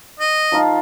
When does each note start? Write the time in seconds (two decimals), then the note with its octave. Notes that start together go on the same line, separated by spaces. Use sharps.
0.20 D#5
0.52 F3 D#4 F4